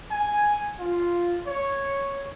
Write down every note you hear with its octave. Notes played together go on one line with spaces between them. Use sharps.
G#5
F4
C#5